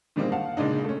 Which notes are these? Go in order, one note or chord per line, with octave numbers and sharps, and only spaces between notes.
A#2 D#3 G3 G#3 A#3 C4
F5 F#5 A5
A#2 C#3 G#3 D4 D#4
A3 C#4